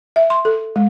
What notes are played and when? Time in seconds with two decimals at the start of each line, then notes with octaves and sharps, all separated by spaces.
0.16 E5
0.30 C6
0.45 A4
0.76 G#3